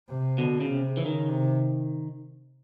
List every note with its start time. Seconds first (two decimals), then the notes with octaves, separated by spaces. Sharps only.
0.09 C3
0.38 B2 D3
0.61 C#3
0.69 C3
0.97 C#3 E3
1.06 D#3
1.28 C3